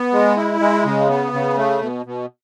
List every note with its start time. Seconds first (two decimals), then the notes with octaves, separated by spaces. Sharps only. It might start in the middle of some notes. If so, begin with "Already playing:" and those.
Already playing: B3
0.13 G#3
0.37 E4
0.60 G#3
0.85 C#3
1.09 B3
1.33 C#3
1.58 A3
1.81 B2
2.06 B2